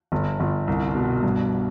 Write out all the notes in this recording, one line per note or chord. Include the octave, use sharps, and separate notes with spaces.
G1
G1
C2
B2
G2